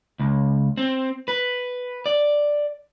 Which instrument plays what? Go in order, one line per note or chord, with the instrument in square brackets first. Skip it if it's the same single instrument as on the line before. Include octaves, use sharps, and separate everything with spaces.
[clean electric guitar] C#2
C4
B4
D5